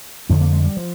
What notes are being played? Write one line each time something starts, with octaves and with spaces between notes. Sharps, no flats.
F2 D3 C4
A#3
G#3
G3
F3